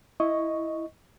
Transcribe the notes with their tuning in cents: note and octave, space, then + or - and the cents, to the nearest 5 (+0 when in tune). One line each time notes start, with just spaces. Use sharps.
E4 +0 D#5 +0 C#6 +0